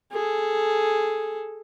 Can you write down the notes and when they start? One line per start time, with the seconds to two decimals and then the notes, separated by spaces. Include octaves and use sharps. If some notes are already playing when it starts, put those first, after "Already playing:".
0.12 G#4 A4